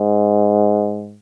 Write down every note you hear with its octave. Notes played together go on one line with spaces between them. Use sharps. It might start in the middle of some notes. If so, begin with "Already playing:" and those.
Already playing: G#2